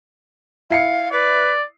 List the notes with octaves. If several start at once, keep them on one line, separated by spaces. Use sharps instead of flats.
E4 F5 C7 C#7
B4 D5